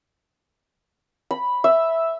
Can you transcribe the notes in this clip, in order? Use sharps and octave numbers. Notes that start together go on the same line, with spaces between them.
B5
E5